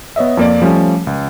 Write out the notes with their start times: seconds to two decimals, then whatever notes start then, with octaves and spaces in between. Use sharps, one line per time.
0.16 B3 C#5 D#5 E5
0.37 F2 A#3 D5
0.62 F3 G3 A3 C#4
1.07 C#2